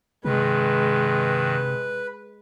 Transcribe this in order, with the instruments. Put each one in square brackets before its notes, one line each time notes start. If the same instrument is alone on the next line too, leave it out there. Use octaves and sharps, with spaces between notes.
[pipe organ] G2 D#3 [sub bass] C3 [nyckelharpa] G#3 [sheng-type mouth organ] B4